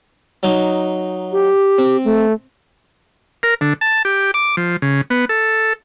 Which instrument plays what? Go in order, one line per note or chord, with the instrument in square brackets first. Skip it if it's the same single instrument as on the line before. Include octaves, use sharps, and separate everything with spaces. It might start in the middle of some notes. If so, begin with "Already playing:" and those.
[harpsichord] F#3 D#4
[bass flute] G4
[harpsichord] C4
[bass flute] A3
[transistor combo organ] A#4
D3
A5
G4
D6
F3
C#3
B3
A4